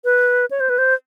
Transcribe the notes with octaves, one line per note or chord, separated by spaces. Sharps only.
B4
C#5
C5
B4
C5